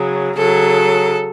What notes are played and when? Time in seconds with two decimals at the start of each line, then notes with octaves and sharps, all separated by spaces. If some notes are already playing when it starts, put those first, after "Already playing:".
Already playing: C#3 F#3
0.37 C#3 F#3 A4